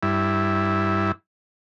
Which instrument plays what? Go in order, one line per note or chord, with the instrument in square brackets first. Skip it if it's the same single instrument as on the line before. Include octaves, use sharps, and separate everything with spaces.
[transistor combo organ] G2 E4